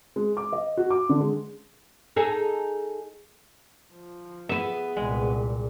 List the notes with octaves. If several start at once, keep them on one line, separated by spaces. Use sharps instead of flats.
G#3
D6
D#5
F#4
D6
D3
G#3
D#4 G#4 A4
F3
B3 G#4 B4 E5
C2 A#2 G#3